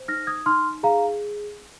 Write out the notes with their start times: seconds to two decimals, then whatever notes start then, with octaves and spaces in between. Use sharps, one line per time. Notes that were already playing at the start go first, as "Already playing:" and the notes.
Already playing: C5
0.08 D#4 F6 A#6
0.27 D#6 G#6
0.46 D#4 C6 F6
0.83 G#4 F5 A#5